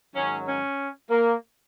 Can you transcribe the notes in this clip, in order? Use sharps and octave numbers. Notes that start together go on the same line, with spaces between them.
G#2 D#3 F#3 C#4
C#4
A#3